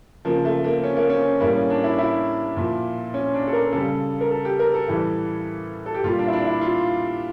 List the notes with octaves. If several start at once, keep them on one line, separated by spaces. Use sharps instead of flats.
C#3 F3 A#3
A3
A#3
C#4
A#3
C#4
A2 G3 A#3
C#4
D4
E4
E4
A#2 F3
C#4
D4
A4
A#4
C#3 G3 A4
A#4
A4
G4
A#4
A4
A2 E3 G3
A4
G4
A#2 G3 F4
D4
E4
D4
E4
F4